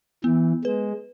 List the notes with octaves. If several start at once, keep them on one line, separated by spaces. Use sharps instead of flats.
E3 B3
G#3 B4